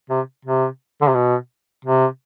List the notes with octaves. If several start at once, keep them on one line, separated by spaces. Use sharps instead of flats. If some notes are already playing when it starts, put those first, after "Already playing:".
C3
C3
D3
C3
B2
C3